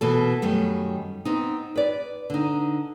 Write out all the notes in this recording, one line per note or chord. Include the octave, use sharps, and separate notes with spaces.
B2 E3 A4
F#2 D#3 G3 A3
B3 C4 D#4
B4 D5
D3 D#4